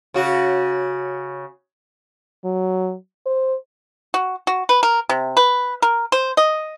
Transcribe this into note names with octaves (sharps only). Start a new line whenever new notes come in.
C#3 F#4
F#3
C5
F#4
F#4
B4
A#4
C3
B4
A#4
C5
D#5